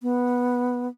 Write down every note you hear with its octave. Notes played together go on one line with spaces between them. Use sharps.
B3